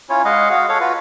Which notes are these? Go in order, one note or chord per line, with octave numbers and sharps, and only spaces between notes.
C#4 E4 F4 C#5
G#3 D#5 F5 F#5
F#4 F5 F#5
A4 C#5 F5 F#5
F4 F#4 B4